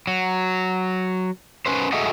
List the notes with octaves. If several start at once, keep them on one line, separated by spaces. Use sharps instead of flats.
F#3
C#4 B4 C5
F#4 G#4 A4 D#5 E5 F#5